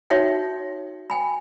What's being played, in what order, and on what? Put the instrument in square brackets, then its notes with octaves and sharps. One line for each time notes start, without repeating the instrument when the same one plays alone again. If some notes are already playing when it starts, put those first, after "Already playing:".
[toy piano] D#4 F#4 C#5 E5 G5
G5 G#5 B5